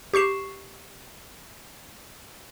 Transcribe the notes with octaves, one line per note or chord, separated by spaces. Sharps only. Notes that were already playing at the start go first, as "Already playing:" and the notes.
G4 C#6 C7 E7